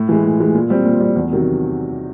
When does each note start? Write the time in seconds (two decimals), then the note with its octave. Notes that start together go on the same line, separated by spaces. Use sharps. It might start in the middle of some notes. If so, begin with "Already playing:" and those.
Already playing: A2
0.09 E3 G#3
0.25 A2
0.40 E3 G#3
0.55 A#2
0.70 G3 C4
0.85 A#2
1.00 G3 C4
1.15 E2
1.31 C3 D#3 F#3